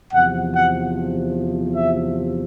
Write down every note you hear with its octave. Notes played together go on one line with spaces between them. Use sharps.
E2 C3 F3 F#5
F#5
E5